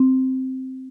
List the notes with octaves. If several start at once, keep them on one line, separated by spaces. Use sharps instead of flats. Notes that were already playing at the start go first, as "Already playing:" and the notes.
Already playing: C4